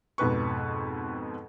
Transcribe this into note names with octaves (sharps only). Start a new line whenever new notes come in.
F2 G#2 B2 B4 C#6